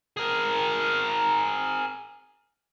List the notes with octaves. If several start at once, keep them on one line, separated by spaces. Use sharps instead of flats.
G#4 A#4